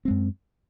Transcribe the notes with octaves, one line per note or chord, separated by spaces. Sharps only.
F#2 G#3 C4